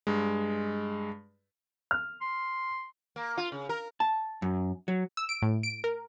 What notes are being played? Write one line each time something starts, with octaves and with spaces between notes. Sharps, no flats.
G2 G#3
F6
C6
A#3
F4
C#3
A#4
A5
F#2
F#3
E6
D7
A2
D7
A#4